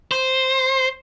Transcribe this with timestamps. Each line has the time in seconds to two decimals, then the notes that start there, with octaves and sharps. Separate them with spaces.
0.11 C5